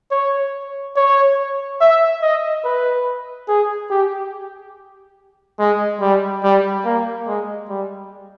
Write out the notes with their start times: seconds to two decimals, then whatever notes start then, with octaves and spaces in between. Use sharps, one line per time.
0.11 C#5
0.96 C#5
1.81 E5
2.22 D#5
2.64 B4
3.48 G#4
3.90 G4
5.59 G#3
6.01 G3
6.43 G3
6.85 A#3
7.27 G#3
7.69 G3